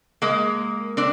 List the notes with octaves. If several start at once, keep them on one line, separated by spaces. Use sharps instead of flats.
G#3 A#3
C4 D4